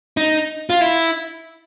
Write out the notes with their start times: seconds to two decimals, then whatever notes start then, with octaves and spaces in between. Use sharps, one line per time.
0.17 D#4
0.70 F4
0.81 E4